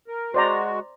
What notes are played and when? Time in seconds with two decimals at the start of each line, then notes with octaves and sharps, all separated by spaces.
0.08 A#4
0.34 G#3 F#4 C5 D5 A#5